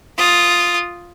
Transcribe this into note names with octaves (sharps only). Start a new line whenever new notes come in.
F4 D#6